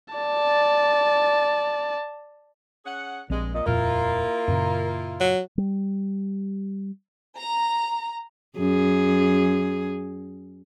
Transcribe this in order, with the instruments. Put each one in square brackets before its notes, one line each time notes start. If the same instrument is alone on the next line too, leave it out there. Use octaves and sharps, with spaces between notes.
[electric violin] D5 A5
[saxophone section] C#4 G#4 F#5
[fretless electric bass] A#1 C4 [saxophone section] G2 G#3
[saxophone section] A#2 [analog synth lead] D#5
[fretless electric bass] D#1 F2 A#2 [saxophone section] A#3 E4 F4 [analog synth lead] A#4
[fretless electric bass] F#2 A#2 C#3
[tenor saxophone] F#3
[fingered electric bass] G3
[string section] A#5
[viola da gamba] F#2 G#4